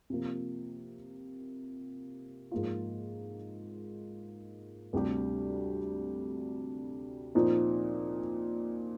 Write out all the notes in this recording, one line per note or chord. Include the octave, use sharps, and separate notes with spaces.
C3 F3 A#3
G#2 F3 A#3 F4
D2 C3 G3 D4 G4
A#2 F3 C4 D#4